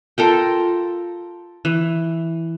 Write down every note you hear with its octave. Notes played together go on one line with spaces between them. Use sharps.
F4 A4 A#4 G5
E3